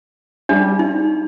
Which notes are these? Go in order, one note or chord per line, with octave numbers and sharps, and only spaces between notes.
G3 D4
D#4